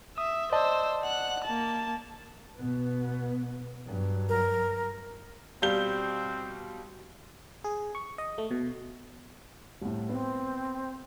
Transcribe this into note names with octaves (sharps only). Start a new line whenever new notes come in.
E5 D#6
C5 D5 D#5 A5 E6
F#5 F#6
A#3 A5
B2 B3
G2 F#3
A#4
B2 G3 C4 G4 F5 G6 G7
G#4
C#6
D#5
A3
B2
C2 A2
B3 C4